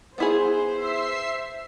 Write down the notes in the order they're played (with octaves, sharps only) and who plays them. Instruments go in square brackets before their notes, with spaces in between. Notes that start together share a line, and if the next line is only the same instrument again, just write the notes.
[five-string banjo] B3 E4 G#4 [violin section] C5
[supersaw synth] E5 E6 C7